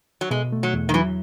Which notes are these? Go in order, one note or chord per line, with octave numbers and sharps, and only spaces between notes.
F#3
B2 G#3
A3
F#3
E2
D#3
E3 F#3